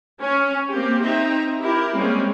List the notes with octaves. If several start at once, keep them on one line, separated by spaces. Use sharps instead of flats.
C#4
A#3 C4 G4
C4 D#4 E5 A#5
E4 G4 A#4
G3 G#3 A#3 C4 C#4